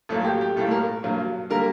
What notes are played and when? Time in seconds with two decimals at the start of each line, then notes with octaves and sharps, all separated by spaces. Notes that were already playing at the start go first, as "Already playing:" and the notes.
0.09 A1 A2 F#3 A#3 A4
0.25 G4
0.41 G4
0.56 A1 A2 G3 A#3 A4
0.71 A#4
1.03 G2 F#3 A#3
1.50 D3 G3 A#3 A#4